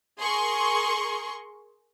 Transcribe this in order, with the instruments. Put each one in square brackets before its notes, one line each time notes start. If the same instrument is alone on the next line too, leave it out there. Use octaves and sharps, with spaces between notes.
[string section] G#4 A#4 C6 C#6